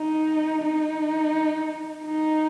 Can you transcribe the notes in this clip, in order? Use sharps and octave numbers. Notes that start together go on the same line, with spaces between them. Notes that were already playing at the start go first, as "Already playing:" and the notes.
Already playing: D#4
D#4
D#4